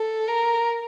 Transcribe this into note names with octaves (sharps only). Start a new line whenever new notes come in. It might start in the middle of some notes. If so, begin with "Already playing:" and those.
Already playing: A4
A#4